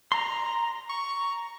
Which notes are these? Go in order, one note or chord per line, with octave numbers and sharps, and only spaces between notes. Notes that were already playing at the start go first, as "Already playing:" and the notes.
A#5 C6
A#5 C#6